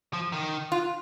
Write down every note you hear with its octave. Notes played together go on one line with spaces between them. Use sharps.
F3
D#3
F4